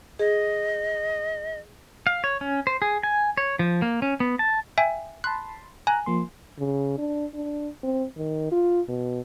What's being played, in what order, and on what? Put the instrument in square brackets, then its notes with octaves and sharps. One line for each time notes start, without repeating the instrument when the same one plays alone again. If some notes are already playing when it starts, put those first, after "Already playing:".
[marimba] G#4 [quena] D#5
[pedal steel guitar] F5
C#5
C#4
C5
G#4
G#5
C#5
F3
A#3
C#4
B3
A5
[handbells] E5 G5 G#5
[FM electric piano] A5 B5 C6 [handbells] F#6
[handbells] G#5 [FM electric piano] A#5 F#6
[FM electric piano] F3 A#3 C6
[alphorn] C#3
D4
D4
C4
D#3
F4
B2